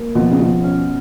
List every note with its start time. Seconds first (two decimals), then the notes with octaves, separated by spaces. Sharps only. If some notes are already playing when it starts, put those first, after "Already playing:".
Already playing: A#3
0.15 B2 F3
0.31 C#3
0.40 B2 F3
0.64 C#4